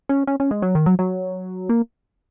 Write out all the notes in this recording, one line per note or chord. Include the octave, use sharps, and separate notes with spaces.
C#4
C#4
C#4
G#3
F#3
D#3
F#3
F#3
A#3